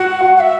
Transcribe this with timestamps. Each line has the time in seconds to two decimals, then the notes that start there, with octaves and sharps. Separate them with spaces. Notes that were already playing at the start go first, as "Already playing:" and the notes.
Already playing: F#4 F#5
0.21 F#4
0.36 F#5
0.39 E5